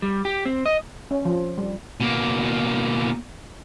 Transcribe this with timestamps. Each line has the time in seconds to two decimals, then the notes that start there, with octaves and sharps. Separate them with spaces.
0.02 G3
0.25 G4
0.46 C4
0.66 D#5
1.11 C#4
1.25 F3
1.58 G3
2.01 B2 A#3